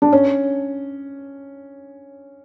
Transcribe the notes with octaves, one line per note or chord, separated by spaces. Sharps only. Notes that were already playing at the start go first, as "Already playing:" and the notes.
D4
C#4